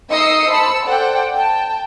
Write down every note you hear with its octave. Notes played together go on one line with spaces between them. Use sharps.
D#4 D#5 D#6 E6 C7 C#7
C5 A5 B5 E6 C#7
A4 C5 D5 F#5 G5
G5 A5